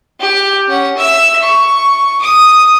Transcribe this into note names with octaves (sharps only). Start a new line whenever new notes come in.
G4
C#4 F#5
E5 E6
C#6
D#6